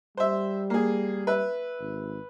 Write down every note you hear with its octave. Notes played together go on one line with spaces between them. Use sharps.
G3 C5 E5
A#3 G#4
B4 E5
G#1